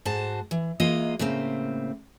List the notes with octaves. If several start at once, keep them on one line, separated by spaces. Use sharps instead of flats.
G#2 F#4 C5 A5
E3
E3 G#3 A#3 F4 D#5
A2 C#3 A#3 C4